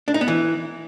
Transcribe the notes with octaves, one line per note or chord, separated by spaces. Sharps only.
D4
D#4
B3
E3